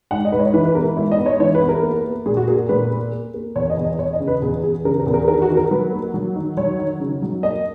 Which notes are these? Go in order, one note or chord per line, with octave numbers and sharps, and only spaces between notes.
G#2 F#5
D#5
G#2 B4
C#5
E3 B4
B4
B3 A#4
G#2 E4
D#5
B3
C#5
E3 C#5
B4
B3
A#4
A#3
A#3
A#2 G#4
F#4
A#3 G#4
A#2 B4
A#3
A#3
A#3
E2 C#5
D#5
E2
D#5
E2 C#5
D#5
C#3
B4
E2 G#4
E2 G#4
C#3 A#4
A#4
E2
A#4
D#3 A#4
F#4
D#3
A#4
F#3 B4
A#3
F#3
D#3
F#3 C#5
D#3
C#3
F#3
A#3 D#5